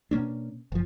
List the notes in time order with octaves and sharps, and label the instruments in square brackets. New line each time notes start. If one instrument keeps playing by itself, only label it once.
[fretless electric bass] B2 A#3 C#4 D4
F#1 F3